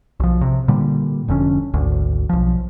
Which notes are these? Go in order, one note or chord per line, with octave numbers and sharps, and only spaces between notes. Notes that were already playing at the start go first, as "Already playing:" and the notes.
B1 F3
C3
A#2 D3 G3
F1 F2 D3 C#4
G#1 D2
B1 F3